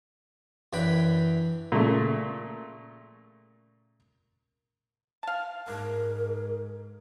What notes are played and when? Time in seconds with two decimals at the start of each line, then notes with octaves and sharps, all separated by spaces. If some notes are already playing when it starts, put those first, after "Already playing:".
0.73 F#2 E3 D4 G5 B5
1.72 A#2 C#3 A3
5.23 F5 A5
5.68 G#2 D4 A#4